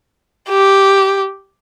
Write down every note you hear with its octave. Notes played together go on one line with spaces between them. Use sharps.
G4